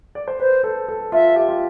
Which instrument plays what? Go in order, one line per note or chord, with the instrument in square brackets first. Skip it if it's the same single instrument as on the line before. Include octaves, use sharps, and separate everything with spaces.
[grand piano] D5
C5
[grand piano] B4 [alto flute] C5
[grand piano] A4
A4
[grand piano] F4 [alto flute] E5
[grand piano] G4
F4